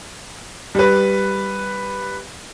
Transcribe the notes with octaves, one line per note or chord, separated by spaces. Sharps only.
G3 B4